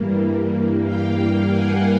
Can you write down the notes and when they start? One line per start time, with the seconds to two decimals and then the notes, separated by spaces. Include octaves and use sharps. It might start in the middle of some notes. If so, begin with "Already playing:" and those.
Already playing: G2 E3 G3 A#3
0.83 F5 G5
1.46 F#5 G#5